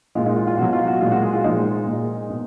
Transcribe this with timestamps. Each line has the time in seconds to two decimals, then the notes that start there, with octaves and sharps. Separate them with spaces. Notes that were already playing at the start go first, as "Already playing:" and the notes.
0.15 A#2 G#3 F4
0.26 D#4
0.36 F4
0.47 F4
0.58 B2 F#3 F#4
0.73 F4
0.87 F#4
1.01 A#2 G#3 F4
1.12 F#4
1.22 G#4
1.33 F4
1.44 A#2 F3 G#3 D#4
1.87 A#2 G#3
2.30 B2